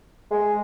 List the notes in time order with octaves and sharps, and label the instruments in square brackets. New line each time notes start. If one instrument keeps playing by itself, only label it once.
[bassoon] G#3